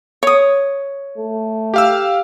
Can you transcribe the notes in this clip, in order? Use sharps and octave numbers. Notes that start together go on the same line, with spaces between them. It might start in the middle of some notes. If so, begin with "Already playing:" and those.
C#5 D#6
A3
G4 F5 E6